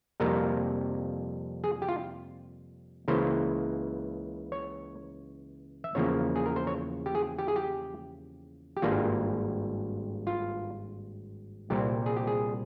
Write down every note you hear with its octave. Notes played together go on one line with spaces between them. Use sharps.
F2 C3 G3 A#3 A#4
G#4
G4
F4
C#2 C#3 E3 A#3 C5
C#5
E5
E2 C#3 F3 A#3 C#5
G#4
A#4
C5
C#5
G4
G#4
G4
G#4
G4
G4
G#1 G2 G3 A#3 F4
F4
C2 A#2 G3 C4 G4
G#4
G4
G#4